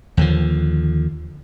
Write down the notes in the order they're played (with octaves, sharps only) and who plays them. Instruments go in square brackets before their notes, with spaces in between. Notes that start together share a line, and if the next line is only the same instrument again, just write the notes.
[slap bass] D#2 D3 F3